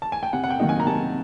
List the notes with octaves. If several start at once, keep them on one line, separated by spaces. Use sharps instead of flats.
A5
G#5
G5
C3 F#5
F#5
G5
D#3 F#3 A#3 D#4
G#5
A#5
C3 A5